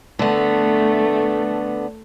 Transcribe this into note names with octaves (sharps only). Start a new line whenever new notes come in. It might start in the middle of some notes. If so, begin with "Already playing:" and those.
D3 A3 B3